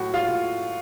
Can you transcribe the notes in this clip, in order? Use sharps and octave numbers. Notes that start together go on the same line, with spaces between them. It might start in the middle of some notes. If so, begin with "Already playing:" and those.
Already playing: A2 F#3 F#4
F4
A2